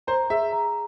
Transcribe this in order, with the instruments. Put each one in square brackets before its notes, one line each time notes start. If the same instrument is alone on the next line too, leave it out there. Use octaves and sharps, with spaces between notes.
[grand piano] C5 [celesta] A#5
[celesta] G#4 [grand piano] E5
[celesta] A#5